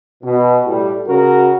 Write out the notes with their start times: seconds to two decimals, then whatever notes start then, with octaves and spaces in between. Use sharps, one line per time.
0.23 B2
0.65 A2 G3
1.07 C#3 F#4 A#4